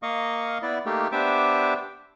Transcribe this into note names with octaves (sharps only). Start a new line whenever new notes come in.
A#3 D#5 F5 C#6
B3 E4 D5
A3 A#3 D#4 G4
B3 D4 G4 C5 E5 D6